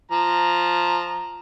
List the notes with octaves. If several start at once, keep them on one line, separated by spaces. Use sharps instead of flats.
F3 A#5